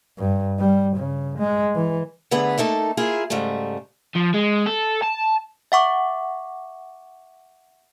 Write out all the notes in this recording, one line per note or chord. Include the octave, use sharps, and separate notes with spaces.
G2
G3
C#3
G#3
E3
D3 A3 B3 G#4 B4
A3 A#3 D#4 A4
A#3 E4 F4 G#4
G#2 C#3 G3 A3
F3
G#3
A4
A5
E5 F#5 C#6 D6